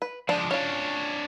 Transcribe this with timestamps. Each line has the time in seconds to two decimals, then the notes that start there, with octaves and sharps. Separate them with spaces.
0.02 B4
0.29 F3 G#3 D4
0.51 C#4 D4 F4 C#5